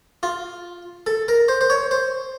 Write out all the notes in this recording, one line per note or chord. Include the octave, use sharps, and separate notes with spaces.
F4
A4
A#4
C5
C5
C#5
C5